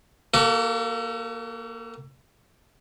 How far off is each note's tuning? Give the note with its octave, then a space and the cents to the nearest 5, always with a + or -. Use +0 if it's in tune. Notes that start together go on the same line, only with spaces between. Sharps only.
A#3 +0 F#4 +45 A4 +35